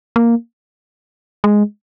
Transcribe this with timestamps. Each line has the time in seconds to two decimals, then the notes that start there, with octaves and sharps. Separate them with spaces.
0.16 A#3
1.44 G#3